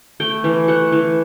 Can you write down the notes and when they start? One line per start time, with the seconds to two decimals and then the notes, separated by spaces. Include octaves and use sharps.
0.20 A3 G5
0.44 E3
0.68 A3 F#5
0.92 E3